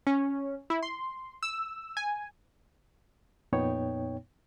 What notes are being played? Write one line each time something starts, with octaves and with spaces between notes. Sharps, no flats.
C#4
E4
C6
E6
G#5
F2 A#2 B3 D#4 C#5 G5